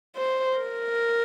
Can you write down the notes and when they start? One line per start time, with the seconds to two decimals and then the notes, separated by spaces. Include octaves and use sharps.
0.16 C5
0.57 A#4